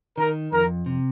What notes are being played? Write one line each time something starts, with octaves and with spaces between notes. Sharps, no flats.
D#3 A#4
F2 A#4
C3